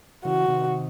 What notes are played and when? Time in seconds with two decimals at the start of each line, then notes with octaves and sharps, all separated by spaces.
0.25 C#3 E3 F#4
0.48 C3 D#3